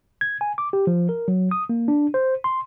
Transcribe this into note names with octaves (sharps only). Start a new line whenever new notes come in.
G#6
G#5
D6
G4
F3
A#4
F#3
D#6
A#3
D4
C5
C6